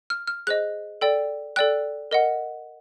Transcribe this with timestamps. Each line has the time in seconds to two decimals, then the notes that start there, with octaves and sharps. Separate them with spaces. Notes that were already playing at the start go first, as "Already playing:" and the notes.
0.10 F6
0.27 F6
0.47 G#4 C5 D#5 F#6
1.01 A4 D5 G5
1.56 A4 D5 G5 F#6
2.11 A#4 D#5 F#5